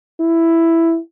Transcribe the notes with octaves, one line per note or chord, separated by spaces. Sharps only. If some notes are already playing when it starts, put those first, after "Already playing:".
E4